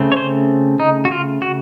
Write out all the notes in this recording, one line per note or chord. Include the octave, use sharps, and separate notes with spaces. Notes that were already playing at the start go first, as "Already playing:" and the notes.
Already playing: C#3 A3 C4
C#5
C5
D#4
F#4
F4
F#4